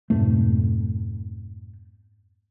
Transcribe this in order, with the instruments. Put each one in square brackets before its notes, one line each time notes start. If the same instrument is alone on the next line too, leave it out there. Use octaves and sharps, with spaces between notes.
[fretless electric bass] F2 G#2 B2 A3